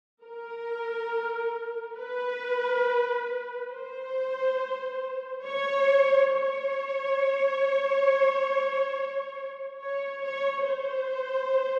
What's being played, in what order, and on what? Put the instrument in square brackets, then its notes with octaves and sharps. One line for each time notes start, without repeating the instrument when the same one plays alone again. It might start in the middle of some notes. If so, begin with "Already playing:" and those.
[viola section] A#4
B4
C5
C#5
C#5
C#5
C#5
C5